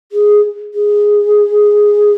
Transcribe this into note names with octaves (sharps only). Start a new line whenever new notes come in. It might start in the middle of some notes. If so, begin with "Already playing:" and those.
G#4
G#4